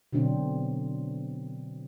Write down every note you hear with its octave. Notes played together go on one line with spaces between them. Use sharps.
B2 D3 F#3 C4 D4